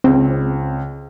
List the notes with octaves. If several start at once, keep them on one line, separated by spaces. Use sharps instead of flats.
C#2 C4